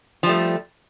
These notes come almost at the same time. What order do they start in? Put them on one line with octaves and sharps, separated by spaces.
F3 G3 A3